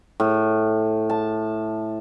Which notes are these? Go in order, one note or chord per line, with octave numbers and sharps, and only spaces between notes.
A2
A5